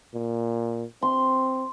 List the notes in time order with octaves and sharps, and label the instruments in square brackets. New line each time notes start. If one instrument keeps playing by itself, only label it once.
[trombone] A#2
[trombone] C4 [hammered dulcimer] C6